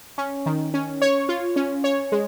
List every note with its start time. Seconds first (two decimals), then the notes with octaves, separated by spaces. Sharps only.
0.18 C#4
0.46 D#3
0.74 C#4
1.01 C#5
1.29 F4
1.56 C#4
1.84 C#5
2.12 G#3